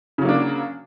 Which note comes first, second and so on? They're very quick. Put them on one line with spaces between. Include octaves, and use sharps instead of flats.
C#3 F#3 A#3 D4